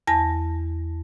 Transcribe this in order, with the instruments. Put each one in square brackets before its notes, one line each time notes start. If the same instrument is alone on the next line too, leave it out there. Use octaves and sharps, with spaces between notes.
[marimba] E2 A5 A#6